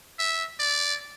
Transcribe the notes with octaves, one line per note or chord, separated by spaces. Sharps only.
E5
D5